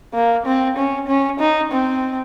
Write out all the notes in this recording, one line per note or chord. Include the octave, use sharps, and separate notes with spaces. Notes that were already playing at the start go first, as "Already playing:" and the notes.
A#3
C4
C#4
C#4
D#4
C4